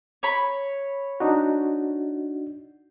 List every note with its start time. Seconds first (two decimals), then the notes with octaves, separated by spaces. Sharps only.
0.23 C#5 B5
1.20 D4 D#4 F#4